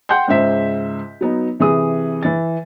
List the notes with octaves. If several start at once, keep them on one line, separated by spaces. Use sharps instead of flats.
F#5 G5 C6 G6
C#2 G#2 C#3 C5 E5 B6
F#3 B3 D#4
C3 E3 G#4 D#6
E3 A6